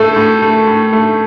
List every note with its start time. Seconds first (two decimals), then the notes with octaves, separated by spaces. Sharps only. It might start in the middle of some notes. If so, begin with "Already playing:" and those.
Already playing: A2 A3 A4
0.16 A2
0.42 A3
0.67 A2
0.93 A3